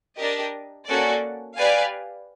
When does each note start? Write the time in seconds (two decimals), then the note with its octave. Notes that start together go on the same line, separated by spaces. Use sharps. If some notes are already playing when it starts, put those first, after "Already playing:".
0.17 D4 G4 A#4 D#5
0.86 A#3 C#4 F#4 A4 D5
1.56 G4 B4 D5 F5 G#5